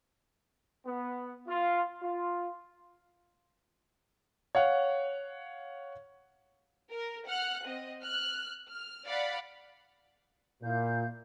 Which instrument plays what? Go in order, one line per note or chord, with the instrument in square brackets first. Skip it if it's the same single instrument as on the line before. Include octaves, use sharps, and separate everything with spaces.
[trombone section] B3
F4
F4
[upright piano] C#5 F5 F#5
[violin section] A#4
F#5 F6 F#6
C4 D#5
F6 F#6
F6
D5 F5 F#5 B5
[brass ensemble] A#2 [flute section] E4 F5 G6